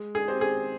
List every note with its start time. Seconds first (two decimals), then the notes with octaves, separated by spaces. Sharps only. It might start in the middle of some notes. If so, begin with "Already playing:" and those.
Already playing: G#3
0.15 G#4
0.28 C4 G4 C5
0.41 G#4